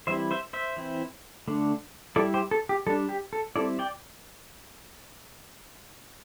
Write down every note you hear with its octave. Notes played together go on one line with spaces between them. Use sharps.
E3 G3 C4 E4 C5 E5
C5 E5
C5 E5
E3 C4 E4
D3 A3 D4
G3 E4 A4 D5
G4 C5
A4
G4
G3 D4 A4
G4
A4
G3 C4 E4 A4 D5
D5 G5